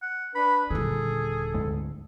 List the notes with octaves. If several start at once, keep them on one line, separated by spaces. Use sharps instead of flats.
F#5
D4 B4 B5
D#1 D3 G#4 A4
D2 G#2